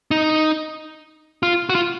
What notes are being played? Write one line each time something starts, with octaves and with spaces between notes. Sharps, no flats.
D#4
F4
F#4
F4